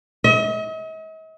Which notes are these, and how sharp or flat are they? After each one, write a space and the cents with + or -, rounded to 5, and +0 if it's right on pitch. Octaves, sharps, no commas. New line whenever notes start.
D#5 +45